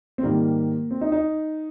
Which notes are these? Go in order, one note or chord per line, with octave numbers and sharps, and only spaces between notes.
C4
G#2 D#3 G3 A#3
C4
D#4
D#4